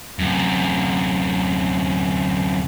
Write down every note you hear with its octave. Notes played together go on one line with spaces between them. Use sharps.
F#2 C3